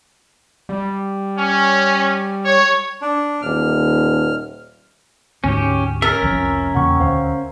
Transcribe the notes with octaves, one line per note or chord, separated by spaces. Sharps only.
G3
C#4
C#5
D4
D#1 F6
D2 G#2 C#4 G4
C#4 A#4 E5 A6
F1 C2 F3
E2 A#2 C#3 F#5 G5 C#6
D2 C5 F5